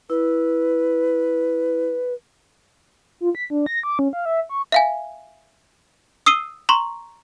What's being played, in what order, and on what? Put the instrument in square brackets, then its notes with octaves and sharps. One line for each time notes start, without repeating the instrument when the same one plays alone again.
[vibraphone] E4 [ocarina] B4
[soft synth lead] F4
B6
D4
A#6
D6
C#4
F5
E5
C#6
[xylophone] E5 F5 G#5
D#6 E6 C7 D#7 G7
A#5 C6 C#6 F#7